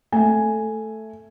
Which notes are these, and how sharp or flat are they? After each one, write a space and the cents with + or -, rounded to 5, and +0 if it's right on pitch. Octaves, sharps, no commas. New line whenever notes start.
A3 +0 G#5 +0